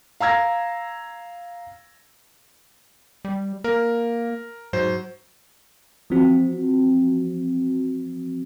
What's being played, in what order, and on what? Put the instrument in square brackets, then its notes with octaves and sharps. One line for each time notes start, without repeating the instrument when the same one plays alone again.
[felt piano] F5 A#5 E6 G#6 A#6
[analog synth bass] G3
[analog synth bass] A#3 [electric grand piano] A#4
[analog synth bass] G#2 [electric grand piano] F#3 C5
[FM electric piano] E3 F3 C4 F#4